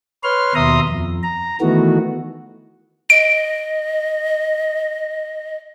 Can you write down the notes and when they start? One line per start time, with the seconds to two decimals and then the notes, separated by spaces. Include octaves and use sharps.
0.23 B4 C#5 C6 F6
0.55 D#2 B2 E5 A#5 C6 D#6
0.89 F2
1.23 A#5
1.61 D#3 E3 A3 B3 F#4
3.10 D#5 D7